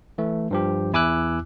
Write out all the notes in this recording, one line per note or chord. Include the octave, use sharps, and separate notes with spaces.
E3 A3
G2 F3 G4
E2 E4 G#5 D6 E6 F#6